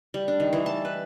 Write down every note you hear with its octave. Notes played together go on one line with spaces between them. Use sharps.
G3
D4
D#3
E3
A5
B4